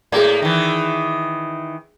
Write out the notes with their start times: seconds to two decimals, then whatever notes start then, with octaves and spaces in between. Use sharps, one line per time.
0.12 A2 A#3 G#4 D5
0.42 D#3 E3